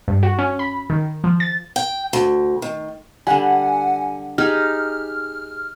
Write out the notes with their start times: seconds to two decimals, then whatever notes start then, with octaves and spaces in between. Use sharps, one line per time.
0.08 G2
0.23 F#4
0.38 C#4
0.59 B5
0.90 D#3
1.24 F3
1.40 A6
1.76 G5
2.13 D2
2.62 D#3
3.27 D3 G3 F#5 G#5
4.38 D#4 G4 G#4 F6